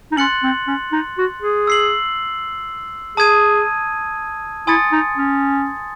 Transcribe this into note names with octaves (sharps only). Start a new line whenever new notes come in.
D#4
C#4 C6 F#6 A6 C#7 F#7
C4
C#4
D#4
F#4
G#4
E6 C7 F#7
G#4 A5 D#6 G#6 D#7
E4 G#5 C6 D#6 A6 C#7
D#4
C#4